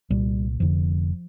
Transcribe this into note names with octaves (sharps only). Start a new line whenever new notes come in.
C2 A#2 G3
F1 F2 D3 F3